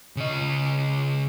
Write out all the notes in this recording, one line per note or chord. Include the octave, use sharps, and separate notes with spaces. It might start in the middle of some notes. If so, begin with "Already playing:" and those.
C#3 D#5